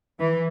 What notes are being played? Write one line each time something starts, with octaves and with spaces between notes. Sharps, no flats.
E3